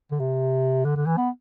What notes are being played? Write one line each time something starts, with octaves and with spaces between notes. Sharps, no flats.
D3
C3
D3
D3
E3
B3